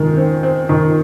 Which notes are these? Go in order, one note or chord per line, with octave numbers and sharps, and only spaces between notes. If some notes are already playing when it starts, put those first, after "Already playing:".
Already playing: D#3 G#3
C4
C4
D#3